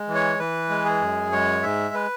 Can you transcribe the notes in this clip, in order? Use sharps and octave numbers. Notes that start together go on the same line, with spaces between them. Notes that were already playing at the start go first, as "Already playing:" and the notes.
Already playing: G#3
E3
C#5
E3 B4
G#3
G#4
F#2
G#3 C#5
G#2 E5
B4